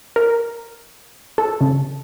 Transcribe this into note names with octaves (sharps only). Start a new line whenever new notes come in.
A#4
A4
C#3